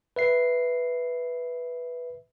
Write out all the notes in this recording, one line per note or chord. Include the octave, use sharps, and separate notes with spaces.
B4 E5 C7